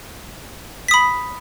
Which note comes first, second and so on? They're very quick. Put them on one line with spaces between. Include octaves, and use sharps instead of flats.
B6 D#6 B5